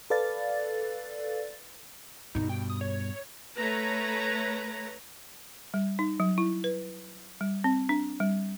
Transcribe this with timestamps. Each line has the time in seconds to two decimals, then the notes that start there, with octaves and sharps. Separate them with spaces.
0.10 A4 B4 D5 F5 A6
2.35 G2 B2 D#4
2.49 G5
2.70 D#6
2.81 C#5
3.57 A3 B4 C#5 A#5
5.74 G3
5.99 D#4
6.20 F#3
6.38 E4
6.64 B4
7.41 G3
7.64 C4
7.89 D4
8.20 G3